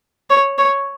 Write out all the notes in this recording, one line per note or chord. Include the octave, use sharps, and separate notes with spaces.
C#5
C#5